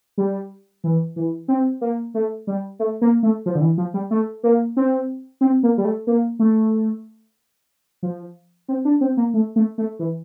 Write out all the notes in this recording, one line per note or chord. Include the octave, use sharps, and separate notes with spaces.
G3
E3
E3
C4
A#3
A3
G3
A3
A#3
A3
F3
D3
E3
F3
G3
A3
A#3
C4
C4
A#3
G3
A3
A#3
A3
F3
C4
D4
C4
A#3
A3
A3
A3
E3